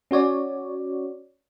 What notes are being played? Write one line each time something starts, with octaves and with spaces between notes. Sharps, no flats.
C#4 F#4 C#5 D5